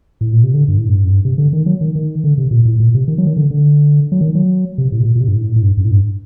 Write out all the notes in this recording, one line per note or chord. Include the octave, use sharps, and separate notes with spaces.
A2
A#2
C3
D3
G2
A2
G2
F#2
G2
C3
D3
D#3
F#3
D#3
D#3
D3
C3
A#2
A2
A#2
C3
D#3
F#3
D#3
D3
D3
F#3
D#3
F#3
C3
A2
C3
A#2
A#2
C3
G2
A2
A2
G2
F#2
A2
G2